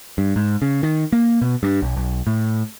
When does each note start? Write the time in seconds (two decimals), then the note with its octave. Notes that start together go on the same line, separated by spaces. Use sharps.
0.18 G2
0.36 G#2
0.62 C#3
0.83 D#3
1.13 A#3
1.42 B2
1.63 G2
1.82 B1
1.97 B1
2.27 A2